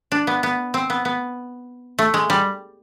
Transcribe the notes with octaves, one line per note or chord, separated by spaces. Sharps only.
D4
B3
B3
C4
B3
B3
A3
G#3
G3